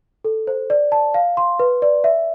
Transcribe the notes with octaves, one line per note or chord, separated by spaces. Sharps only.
A4
C5
D5
A5
F5
C6
B4
D5
E5